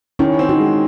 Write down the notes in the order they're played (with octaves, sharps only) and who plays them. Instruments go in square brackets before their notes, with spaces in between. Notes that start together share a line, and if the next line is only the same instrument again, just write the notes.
[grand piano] D#3 [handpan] C#4 E4
[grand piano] C4
[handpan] D#4 F#4
[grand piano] G#3